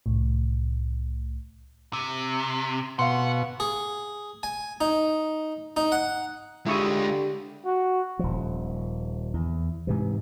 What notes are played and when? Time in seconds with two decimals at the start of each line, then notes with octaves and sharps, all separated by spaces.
0.06 C2 A2
1.93 C3
2.99 B2 F5 F#5 C6
3.60 G#4
4.43 G#5
4.81 D#4
5.77 D#4
5.92 F#5
6.66 D3 G#3 E4 F4 G4 C#6 D#6
7.65 F#4
8.19 D#1 F3
9.34 E2
9.87 G#2 C3 E3